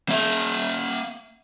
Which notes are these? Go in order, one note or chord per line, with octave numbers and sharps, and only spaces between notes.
A#3 E5